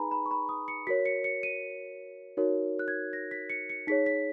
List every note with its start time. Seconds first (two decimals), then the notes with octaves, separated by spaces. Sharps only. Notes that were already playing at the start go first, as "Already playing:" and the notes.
Already playing: D#4 G#4 B4 G#5 A#5 B5
0.11 B5
0.26 C#6
0.31 B5
0.49 D#6
0.68 C#7
0.87 F#4 A#4 C#5 B6
1.06 C#7
1.24 C#7
1.43 D#7
2.37 D#4 F#4 A#4 C#5
2.79 F#6
2.88 G#6
3.13 A#6
3.31 B6
3.50 C#7
3.70 C#7
3.87 D#4 G#4 C#5 B6
4.06 B6